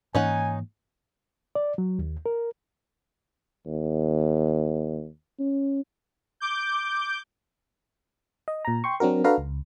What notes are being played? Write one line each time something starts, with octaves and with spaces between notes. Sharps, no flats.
G#2 E3 A#3 C#4 D#4 F#5 G#5
D5
F#3
D#2
A#4
D#2
C#4
D6 G6
D#5
A#2 A#5
G5 C6 C#6
F#3 C4 D4 F#4 A#4
D4 F#4 A4 B4 F5 A#5
C#2